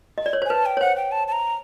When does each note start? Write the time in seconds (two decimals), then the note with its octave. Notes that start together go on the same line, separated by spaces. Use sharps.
0.18 D#5
0.26 D5
0.33 C#5
0.42 C5
0.46 G#5
0.50 B4 A5
0.66 G5
0.77 C#5
0.81 C5 F#5
0.96 G5
1.12 A5
1.28 A5
1.32 A#5